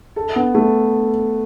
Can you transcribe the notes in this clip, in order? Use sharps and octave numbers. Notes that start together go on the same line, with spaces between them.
A4
B3
A3